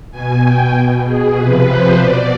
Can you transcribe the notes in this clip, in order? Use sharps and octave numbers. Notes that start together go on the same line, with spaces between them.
B2 G#5
G5
B2
G#4
C3 F3 B4
C5
B2 D5